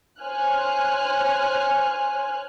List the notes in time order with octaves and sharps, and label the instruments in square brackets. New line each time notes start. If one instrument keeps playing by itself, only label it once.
[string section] C5 C#5 G#5 F6 F#6